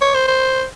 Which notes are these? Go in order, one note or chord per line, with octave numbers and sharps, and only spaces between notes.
C#5
C5
C5